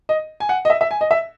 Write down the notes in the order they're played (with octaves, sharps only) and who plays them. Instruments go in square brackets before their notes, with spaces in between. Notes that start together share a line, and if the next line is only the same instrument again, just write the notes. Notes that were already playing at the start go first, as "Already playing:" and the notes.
[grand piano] D#5
G#5
F#5
D#5
E5
E5
G#5
D#5
E5